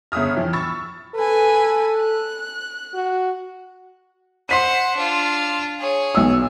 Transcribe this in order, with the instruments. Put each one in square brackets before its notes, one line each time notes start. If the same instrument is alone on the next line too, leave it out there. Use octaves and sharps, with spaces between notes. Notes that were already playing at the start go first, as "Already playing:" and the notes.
[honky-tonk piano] G1 C#3 E5 D#6 F6
F2 E3
B5 C#6 E6 A6
[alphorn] A4 [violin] B4 G#5
[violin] F#6
[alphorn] F#4
[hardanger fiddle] C5 F#5 [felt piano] C6 B6 D#7
[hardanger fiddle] D4 F4
G#4 C#5
[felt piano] B1 E6